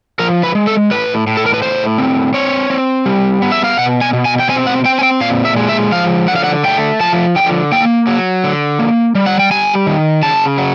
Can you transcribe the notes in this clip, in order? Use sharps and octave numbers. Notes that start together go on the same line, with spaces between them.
F3 A#4
B4
G#3
A4
A2 B4
A2
A4
A#4
B4
A2 C5
C4
C4 C#5
C4
G3
B3
E5
F5
B2 F#5
G#5
B2
G#5
G5
C4 G#5
F#5
C4 G5
G#5
G5
A#2 F5
E5
G#3
E5
F3 F5
D3 F#5
F5
F#5
A3 G5
F3 A5
D3 G5
A#3 G5
F#3
D3
A#3
G3
F#5
G5
G3 G#5
D#3
C#3 A5
F#3